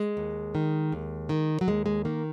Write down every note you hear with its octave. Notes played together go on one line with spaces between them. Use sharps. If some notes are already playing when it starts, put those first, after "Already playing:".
Already playing: G#3
D#2
D#3
D#2
D#3
F#3
D#2 G#3
G#3
D#3 A#3